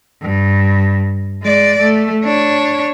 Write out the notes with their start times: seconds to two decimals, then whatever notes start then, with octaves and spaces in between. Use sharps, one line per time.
0.22 G2
1.43 G#3 D5
1.81 A3
2.23 D4 C#5